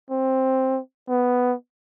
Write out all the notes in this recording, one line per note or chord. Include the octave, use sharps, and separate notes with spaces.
C4
B3